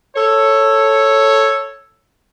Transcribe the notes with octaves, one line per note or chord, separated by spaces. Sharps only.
A4 C#5